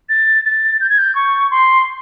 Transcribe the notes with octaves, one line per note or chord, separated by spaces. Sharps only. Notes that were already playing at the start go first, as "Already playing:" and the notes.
A6
A6
G6
G#6
G6
C#6
C6